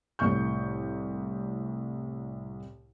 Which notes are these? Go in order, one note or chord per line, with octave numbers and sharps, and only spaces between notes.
C2 A2 C#6 G6